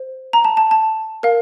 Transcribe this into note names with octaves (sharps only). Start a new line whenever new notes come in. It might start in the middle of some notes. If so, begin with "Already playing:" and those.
Already playing: C5
A#5
A5
A5
A5
A#4 F5